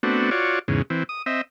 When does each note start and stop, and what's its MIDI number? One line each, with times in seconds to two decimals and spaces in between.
0.03 0.30 57
0.03 0.30 59
0.03 0.30 60
0.03 0.30 62
0.03 0.30 66
0.31 0.59 65
0.31 0.59 66
0.31 0.59 73
0.31 0.59 74
0.68 0.82 40
0.68 0.82 44
0.68 0.82 49
0.90 1.03 52
0.90 1.03 60
1.09 1.22 87
1.26 1.41 60
1.26 1.41 75
1.26 1.41 76